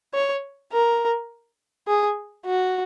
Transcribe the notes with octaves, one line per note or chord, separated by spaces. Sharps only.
C#5
A#4
G#4
F#4